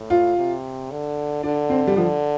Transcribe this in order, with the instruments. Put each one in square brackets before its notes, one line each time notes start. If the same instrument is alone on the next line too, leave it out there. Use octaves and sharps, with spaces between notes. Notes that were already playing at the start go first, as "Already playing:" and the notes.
Already playing: [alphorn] A2
[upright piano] F4
[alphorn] C3
D3
[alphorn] D3 [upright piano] D4
[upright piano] C4
G3
[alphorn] D3 [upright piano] F3